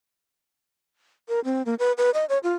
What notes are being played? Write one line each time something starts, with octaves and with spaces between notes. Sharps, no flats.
A#4
C4
A#3
B4
B4
D#5
C#5
F4